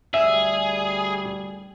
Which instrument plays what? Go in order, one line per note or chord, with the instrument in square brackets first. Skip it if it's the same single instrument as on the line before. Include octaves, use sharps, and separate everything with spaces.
[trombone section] D2 G3 [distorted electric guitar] G#4 [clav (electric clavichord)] E5